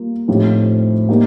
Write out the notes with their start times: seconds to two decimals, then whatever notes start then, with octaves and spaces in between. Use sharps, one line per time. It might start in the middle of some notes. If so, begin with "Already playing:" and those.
Already playing: G3 A#3 F4
0.28 A2 F3 C4 D#4 G4
1.08 G3 A#3 D#4 G4